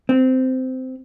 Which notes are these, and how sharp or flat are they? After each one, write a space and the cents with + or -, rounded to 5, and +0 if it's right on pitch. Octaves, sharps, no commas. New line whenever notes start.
C4 -15